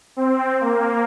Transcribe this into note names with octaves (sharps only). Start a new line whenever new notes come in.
C4
A#3